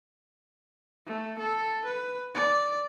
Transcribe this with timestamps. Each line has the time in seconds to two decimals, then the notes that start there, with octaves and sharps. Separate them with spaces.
1.06 A3
1.39 A4
1.85 B4
2.34 D5